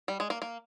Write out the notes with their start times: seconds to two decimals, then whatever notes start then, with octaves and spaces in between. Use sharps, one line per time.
0.08 G3
0.20 G#3
0.30 A#3
0.42 A#3